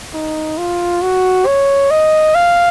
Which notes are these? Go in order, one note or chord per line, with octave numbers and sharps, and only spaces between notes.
D#4
F4
F#4
C#5
D#5
F5